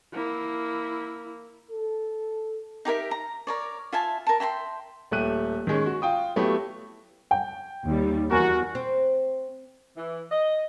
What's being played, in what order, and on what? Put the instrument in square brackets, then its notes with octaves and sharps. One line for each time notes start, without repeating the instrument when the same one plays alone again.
[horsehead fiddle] A#3 E4
[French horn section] A4
[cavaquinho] D#4 G4 A#4 E5
A#5
A#4 C#5 D5
F4 E5 G#5 A5
A#4 A5
E5 G5 A#5 C6
[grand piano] D#1 A3 G4 F#6 D#7
D#3 G#3 C#4
F#4
F4 G5 D#6
F#3 A3 B3 E4 G4
[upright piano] G5
[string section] D#2 G3
[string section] E2 [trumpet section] F#4 [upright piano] A#4 G#5
[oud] C4
[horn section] E3
D#5